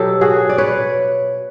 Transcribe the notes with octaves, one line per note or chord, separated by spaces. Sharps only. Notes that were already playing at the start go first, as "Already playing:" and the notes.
Already playing: B2 F#3 G4 A4
F#4 G#4
D5
B4 C#5